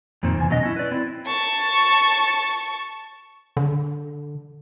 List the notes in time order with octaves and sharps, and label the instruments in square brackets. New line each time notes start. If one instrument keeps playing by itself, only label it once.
[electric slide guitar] F2 A#2 D#3 C4
E2 C3 G#5
B2 F#3 B3 D4 D#5
C#4 E4
B4 D5
C4 E4
[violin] A5 C#6
[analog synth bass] D3